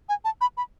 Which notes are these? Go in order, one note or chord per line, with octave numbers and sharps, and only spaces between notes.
G#5
A5
B5
B5